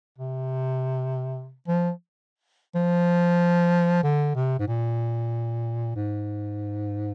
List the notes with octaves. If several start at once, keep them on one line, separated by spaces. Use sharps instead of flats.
C3
F3
F3
D3
C3
G#2
A#2
G#2